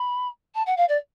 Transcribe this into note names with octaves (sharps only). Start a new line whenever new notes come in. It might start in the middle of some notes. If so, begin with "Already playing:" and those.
Already playing: B5
A5
F#5
F5
D5